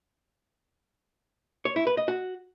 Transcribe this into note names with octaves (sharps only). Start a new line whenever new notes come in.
C#5
E4
B4
D#5
F#4